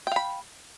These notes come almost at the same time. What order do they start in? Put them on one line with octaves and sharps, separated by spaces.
G5 F5 B5